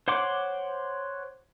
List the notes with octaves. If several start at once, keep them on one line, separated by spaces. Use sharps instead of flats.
C5 C#5 F#5 C6 D6